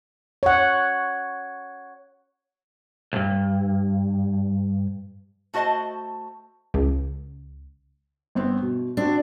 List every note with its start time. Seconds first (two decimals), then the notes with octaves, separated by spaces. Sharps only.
0.43 C#5 F#5
3.13 C2 G2
5.54 A3 F#4 C5 D#5 A5
6.74 C#2
8.35 G1 B3 C4
8.62 B2
8.97 C4 D4 F#4